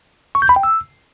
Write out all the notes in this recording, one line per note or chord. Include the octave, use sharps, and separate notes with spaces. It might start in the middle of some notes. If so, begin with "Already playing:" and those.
C#6
G6
B5
G5
E6